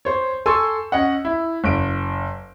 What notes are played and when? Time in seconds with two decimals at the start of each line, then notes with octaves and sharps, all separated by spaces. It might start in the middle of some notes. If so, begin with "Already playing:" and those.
0.05 C5 C#5
0.46 A4 G#5 C6 C#6 E6
0.92 C#4 D#5 F#5
1.25 E4
1.64 F#1 D7